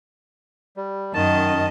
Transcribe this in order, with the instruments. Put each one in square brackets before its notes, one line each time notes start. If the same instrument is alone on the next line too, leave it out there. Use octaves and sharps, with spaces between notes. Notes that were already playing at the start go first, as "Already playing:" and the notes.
[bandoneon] G3
[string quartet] F#2 D#5 [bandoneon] D#3 A5